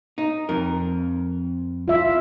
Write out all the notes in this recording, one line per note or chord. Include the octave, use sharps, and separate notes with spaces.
D#4
F2 A#4
F4 E5